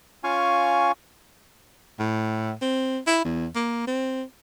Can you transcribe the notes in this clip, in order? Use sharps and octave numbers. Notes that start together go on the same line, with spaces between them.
C#4 F4 F5 G#5 C#6
A2
C4
E4
E2
A#3
C4